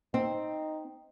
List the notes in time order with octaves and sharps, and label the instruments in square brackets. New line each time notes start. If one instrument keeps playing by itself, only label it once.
[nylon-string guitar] C4 [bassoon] D#4